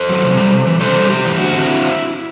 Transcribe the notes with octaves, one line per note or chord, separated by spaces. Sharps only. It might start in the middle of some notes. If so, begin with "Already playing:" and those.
Already playing: A4 C5
F#3
C3
G3
C3
E3
C3 A4 C5
G3
C3 G4
E3
D3 F#4
C4
E4